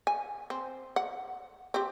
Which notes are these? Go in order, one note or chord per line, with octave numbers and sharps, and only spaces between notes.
G#5
C4
F#5
C4 G4